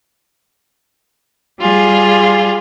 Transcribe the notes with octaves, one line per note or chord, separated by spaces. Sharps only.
G3 F4 G#4